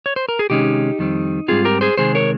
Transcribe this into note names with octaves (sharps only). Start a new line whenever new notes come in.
C#5
C5
A#4
G#4
C3 D#3 G#3 C#4 D#4 G4
F2 D#3 G3 C4
G#2 G3 C4 F4 G#4
G4 A#4
G#4 C5
C3 D#3 G#3 C4 G#4 C5
A#4 C#5